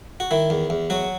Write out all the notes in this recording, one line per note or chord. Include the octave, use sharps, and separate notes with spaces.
F#4
D#3 E4
E2
E2
F#3 F#4